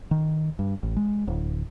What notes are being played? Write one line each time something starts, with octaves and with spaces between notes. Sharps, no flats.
D#3
G2
A1
G#3
D1